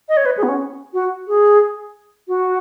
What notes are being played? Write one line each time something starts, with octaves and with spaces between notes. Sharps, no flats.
D#5
C#5
B4
G#4
B3
C#4
F#4
G#4
F#4